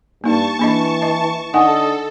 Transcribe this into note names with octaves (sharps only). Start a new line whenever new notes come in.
G2 A#3 D#4 A5 C#6
E3 A#3 D4 D#5
D#5
D3 D#4 A4 D#5 F#5 G#5